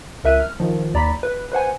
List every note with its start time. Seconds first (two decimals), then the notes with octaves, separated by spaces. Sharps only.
0.24 C#2 A#4 E5 F#6 D#7
0.40 F6
0.60 D#3 F3
0.94 D#2 D5 A#5 B5 B6
1.23 B4
1.52 B4 C5 F#5 G#5